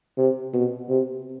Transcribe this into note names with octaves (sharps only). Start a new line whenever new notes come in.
C3
B2
C3